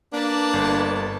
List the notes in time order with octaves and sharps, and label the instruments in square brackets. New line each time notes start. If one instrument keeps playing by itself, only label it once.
[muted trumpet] A#3 [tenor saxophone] D4 [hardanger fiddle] B4 A5
[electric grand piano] G1